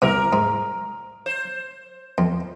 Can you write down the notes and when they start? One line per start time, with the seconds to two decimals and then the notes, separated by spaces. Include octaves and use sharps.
0.02 C2 C3 A#4
0.33 G#2
1.26 C5
2.18 F2